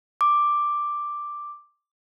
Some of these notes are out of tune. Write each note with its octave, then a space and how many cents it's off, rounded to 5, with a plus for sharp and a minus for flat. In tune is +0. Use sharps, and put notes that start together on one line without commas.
D6 +5